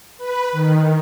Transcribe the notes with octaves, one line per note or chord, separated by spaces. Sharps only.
B4
D#3